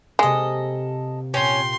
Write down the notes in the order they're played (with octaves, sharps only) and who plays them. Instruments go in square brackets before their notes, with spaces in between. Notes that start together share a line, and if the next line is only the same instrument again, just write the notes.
[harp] C3 A#3 [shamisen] G#3 [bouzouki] A4 D#5
[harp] A#2 G5 [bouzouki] C#4 [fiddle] C6